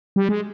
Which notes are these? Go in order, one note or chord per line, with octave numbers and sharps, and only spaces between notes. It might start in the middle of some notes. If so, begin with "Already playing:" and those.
G3
G#3